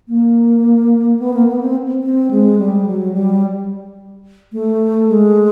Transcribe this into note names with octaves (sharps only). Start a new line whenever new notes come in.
A#3
B3
A#3
B3
C4
C4
G#3
G3
F#3
G3
A3
G#3